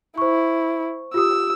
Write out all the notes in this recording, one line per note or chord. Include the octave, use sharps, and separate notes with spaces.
E4 C5 C#6
F4 G4 D#6 E6